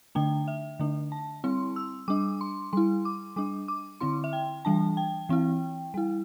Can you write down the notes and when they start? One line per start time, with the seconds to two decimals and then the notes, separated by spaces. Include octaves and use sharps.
0.15 D3 A3 D4 G5
0.48 E5
0.79 D3 A3 D4
1.12 A5
1.44 G3 C4 E4 C6
1.76 E6
2.08 G3 D4 D6
2.41 C6
2.73 G3 E4 C6
3.05 D6
3.36 G3 D4 D6
3.68 D6
4.01 D3 C4 E4 C6
4.24 E5
4.33 G5
4.65 E3 G3 D4 A5
4.97 G5
5.29 E3 C4 E4
5.94 G3 E4